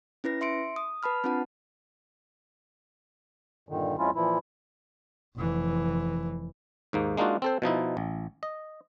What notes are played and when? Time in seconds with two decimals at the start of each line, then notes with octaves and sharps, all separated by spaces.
0.24 C#4 E4 B4 A#6
0.41 E5 C6 C#7 D7
0.76 D#6
1.03 B4 A5 B5 F6
1.24 C4 D4 F4 B4 F#5 A5
3.69 G2 A#2 D3 D#3
3.98 F2 F3 G#3 C#4 E4 F4
4.15 A#2 E3 F3 E4
5.36 F1 E3
6.93 D#2 G#2 A#3
7.17 G#3 A#3 D4 D#4 F4 F#4
7.42 C4 A4 C5
7.62 B2 F3 D#4 E4
7.97 A1
8.43 D#5